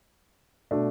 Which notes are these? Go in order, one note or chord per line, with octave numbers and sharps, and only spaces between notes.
B2 A3 D4